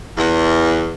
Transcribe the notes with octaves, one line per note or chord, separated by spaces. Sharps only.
E2